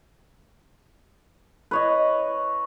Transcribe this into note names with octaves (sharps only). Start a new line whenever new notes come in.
B4 C#5 D#5